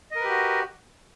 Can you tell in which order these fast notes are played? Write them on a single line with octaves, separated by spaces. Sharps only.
D#5 A#4 B4 G4 F#4